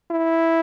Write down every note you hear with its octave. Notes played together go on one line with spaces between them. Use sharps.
E4